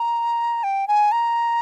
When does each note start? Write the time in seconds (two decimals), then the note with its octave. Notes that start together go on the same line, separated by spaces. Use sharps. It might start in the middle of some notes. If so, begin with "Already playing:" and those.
Already playing: A#5
0.64 G5
0.88 G#5
1.12 A#5